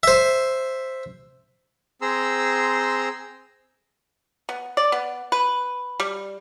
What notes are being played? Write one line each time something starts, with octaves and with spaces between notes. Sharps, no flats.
C5 E5
C4 G#4 A#5 C6 E6
B3
D5
B3
B4
G3